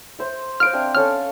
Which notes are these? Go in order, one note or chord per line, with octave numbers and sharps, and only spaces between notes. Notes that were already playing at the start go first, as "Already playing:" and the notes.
C5 E5
C5 D#5 F5 F6 D7
C4 D4 E5
C#4 A4 F5 F6